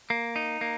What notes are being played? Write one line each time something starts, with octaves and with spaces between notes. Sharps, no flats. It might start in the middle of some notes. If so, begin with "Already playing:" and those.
A#3
D#4
A#3